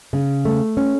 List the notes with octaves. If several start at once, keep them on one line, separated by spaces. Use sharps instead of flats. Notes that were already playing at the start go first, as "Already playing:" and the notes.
C#3
A3
C#4